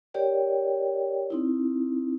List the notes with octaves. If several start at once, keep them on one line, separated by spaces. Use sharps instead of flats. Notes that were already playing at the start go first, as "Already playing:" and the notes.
G4 A#4 C#5 D5 G5
C4 D#4 E4